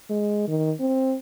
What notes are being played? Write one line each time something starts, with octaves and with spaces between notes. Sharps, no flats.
G#3
D#3
C4